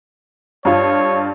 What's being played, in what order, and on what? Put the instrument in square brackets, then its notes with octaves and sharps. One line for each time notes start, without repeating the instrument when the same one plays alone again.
[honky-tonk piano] G2 F4 [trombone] C#5